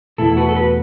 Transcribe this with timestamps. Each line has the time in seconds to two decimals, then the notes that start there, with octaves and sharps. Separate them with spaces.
0.18 E2 B2 A3 E4 A4
0.37 F#4 B4
0.49 A4
0.55 F#4 B4